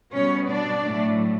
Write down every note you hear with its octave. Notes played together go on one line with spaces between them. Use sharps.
B2 G3 B3 C#4 C#5
D4 D5
A2 F#3 A3